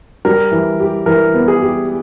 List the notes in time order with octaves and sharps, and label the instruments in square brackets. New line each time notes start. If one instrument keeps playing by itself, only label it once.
[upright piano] G3 [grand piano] A#4
[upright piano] E3
G4
[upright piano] E3 [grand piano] A#4
[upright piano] B3
[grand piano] G#4
[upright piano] G4